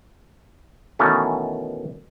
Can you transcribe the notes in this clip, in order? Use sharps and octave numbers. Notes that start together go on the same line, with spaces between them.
B2 D#3 E3 A3 C#4